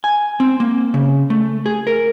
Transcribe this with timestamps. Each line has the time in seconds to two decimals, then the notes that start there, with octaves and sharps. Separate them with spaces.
0.04 G#5
0.40 C4
0.60 A#3
0.94 C#3
1.30 A3
1.66 G#4
1.87 A#4